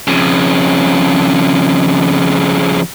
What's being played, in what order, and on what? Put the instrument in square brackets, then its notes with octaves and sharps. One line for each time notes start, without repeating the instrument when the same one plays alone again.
[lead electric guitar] F2 C#3